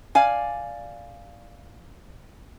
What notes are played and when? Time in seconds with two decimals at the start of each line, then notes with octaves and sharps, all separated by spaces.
0.15 D5 F5 G#5